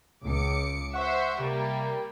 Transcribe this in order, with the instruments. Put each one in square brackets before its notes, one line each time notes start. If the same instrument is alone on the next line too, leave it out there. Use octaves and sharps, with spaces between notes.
[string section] C#2 D6 C#7
[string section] C5 E5 [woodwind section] F#5 C#6
[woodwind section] C3 [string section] G3 A#3